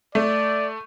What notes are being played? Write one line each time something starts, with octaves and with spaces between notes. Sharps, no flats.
A3 D5